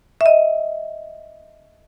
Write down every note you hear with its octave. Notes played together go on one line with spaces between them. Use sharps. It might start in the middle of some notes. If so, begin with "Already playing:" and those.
E5
D#5